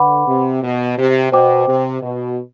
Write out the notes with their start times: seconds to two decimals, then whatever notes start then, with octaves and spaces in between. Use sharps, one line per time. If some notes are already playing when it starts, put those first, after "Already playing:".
Already playing: D3 B4 F#5 B5 D6
0.27 C3
0.63 B2
0.98 C3
1.32 B2 C5 G5 D6
1.67 C3
2.02 B2